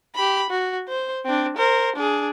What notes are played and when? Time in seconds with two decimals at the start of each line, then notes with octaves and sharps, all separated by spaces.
0.15 G4 B5
0.50 F#4
0.89 C5
1.25 C4 D4
1.57 A#4 C5
1.96 D4 G#4